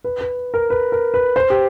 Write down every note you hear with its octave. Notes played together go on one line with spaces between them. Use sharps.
B4
B4
A#4
B4
A#4
B4
C5
G4